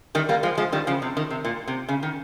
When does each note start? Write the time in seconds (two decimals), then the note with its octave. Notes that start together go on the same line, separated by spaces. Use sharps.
0.15 D#3 G3
0.29 G3 A#3
0.43 F3 G#3
0.57 F3 G#3
0.72 D#3 G3
0.87 C#3 F3
1.02 C3
1.17 D#3
1.30 C3
1.45 A#2
1.68 C3
1.89 C#3
2.03 D#3